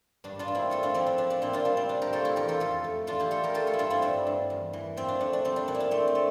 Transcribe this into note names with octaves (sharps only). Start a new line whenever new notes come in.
G2 D4
D4 F4
G2
C4 E4
A3 F4 A4
D4 F4
F3 C4 E4
D4
F3 D4
D4
A#2 C4 E4
D4 F4
G3 D4
C4
C3 D4
G4 A#4
A3 F4 A4
E4 G4
E2 G4 A#4
F4 A4
F2 F4 A4
A3
E2 D4 F4
E4 G4
A3 F4 A4
G4 A#4
A3 F4 A4
F4 A4
E4
G2 D4 F4
C4 E4
G2 D4
G2
E2
E3
F3 C4
D4
A3 D4
D4
G3 C4
D4
A#2 D4
E4
D4
A3 C4
C4
A3